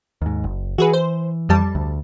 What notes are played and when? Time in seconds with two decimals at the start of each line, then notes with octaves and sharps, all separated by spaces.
0.22 D#2 G#2
0.44 F#1
0.78 E3 F#4 G#4 B4
0.93 C5
1.49 F2 G3 A5
1.75 D2